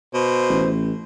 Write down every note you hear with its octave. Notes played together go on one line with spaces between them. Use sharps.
B2 C5
A1